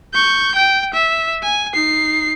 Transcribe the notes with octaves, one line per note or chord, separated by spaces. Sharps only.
C#6 G6
G5
E5
G#5
D#4 C7